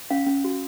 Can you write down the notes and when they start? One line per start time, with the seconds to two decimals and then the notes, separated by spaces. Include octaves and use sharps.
0.11 C#4 F5
0.27 C#4
0.44 F#4